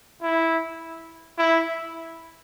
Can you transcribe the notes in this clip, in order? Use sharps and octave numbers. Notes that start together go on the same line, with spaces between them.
E4
E4